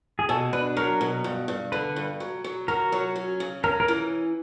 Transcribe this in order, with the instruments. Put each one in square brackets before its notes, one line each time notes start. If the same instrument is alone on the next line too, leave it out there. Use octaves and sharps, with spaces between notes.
[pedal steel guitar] G#4
[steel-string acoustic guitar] B2 [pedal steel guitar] A4
[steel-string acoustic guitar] D4 [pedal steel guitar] B4
[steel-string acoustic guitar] F#3 [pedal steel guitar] A#4
[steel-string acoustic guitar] B2
G2
G2
[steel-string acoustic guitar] D3 [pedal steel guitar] B4
[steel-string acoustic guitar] G2
F#3
F#3
[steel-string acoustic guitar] F#4 [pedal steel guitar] A#4
[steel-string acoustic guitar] F#3
C#4
C#3
[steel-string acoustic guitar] C#4 [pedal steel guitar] A#4
[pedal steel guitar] A#4
[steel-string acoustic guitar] E3